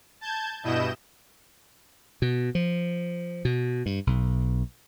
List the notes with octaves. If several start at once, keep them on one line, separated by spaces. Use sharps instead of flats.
A5 G6 G#6
G2 B2 E4 D#5 G6 E7
B2
F3
B2
G2
B1